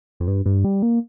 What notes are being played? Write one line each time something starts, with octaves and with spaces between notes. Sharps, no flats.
F2
G2
G2
G3
A#3